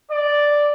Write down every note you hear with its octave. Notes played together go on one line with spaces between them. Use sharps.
D5